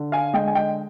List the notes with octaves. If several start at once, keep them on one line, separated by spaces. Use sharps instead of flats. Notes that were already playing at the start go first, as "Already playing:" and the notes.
Already playing: D3
F5 G#5
G#3 D#5 G5
G#5
D#5 G5